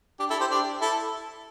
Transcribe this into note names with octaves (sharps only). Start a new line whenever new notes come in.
D4 G4
E4 A4
G4 C5
D4 G4
E4 A4